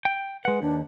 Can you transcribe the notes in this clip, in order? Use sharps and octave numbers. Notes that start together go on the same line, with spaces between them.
G5
G#3 B4 F#5
D#2 D4